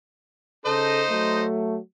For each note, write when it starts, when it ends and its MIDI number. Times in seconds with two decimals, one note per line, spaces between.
0.66 1.03 49
0.66 1.43 63
0.66 1.03 69
0.66 1.43 72
0.66 1.43 75
1.09 1.78 54
1.09 1.78 57